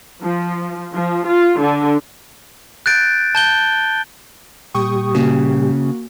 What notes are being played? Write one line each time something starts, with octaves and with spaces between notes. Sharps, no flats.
F3
F3
F4
D3
F#6 G6 A6 D7
A5 G6 G7
A#2 G3 G4 G5 C#6 D#6
C#3 A#3 C#4 F#4